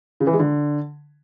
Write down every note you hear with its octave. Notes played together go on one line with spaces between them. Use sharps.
C#3
E3
G#3
D3